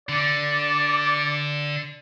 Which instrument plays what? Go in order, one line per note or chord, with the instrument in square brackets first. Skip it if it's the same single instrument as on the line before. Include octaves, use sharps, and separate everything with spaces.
[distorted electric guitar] D3 [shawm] D5